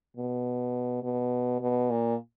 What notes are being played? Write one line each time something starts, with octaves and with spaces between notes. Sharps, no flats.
B2
B2
B2
A#2